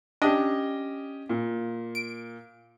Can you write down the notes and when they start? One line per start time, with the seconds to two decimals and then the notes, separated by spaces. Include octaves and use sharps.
0.22 C#4 D4 G4 D#5
1.29 A#2
1.95 D7